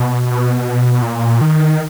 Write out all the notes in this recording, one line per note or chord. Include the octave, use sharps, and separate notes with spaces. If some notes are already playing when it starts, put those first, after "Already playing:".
Already playing: B2
A#2
D#3